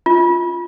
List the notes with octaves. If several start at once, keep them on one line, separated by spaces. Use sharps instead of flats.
F4